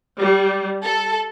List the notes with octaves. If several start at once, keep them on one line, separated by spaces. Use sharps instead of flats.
G3
A4